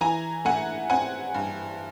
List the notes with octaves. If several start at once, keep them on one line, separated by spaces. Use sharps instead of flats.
E3 G#5 A#5
A3 F#5 G#5
C4 F#5 G#5
G2